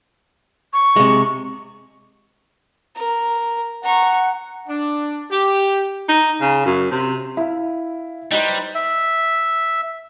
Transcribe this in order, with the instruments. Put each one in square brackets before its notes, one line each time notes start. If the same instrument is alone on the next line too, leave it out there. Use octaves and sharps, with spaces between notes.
[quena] C#6
[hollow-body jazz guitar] C3 G#3
[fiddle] A#4
[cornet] F#5 [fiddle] A#5 C#6
[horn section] D4
G4
[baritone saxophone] D#4
C#3
F#2
C3
[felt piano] E4 [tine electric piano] E5 F5
[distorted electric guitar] G3 [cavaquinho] D#4 B4 C5
[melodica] E5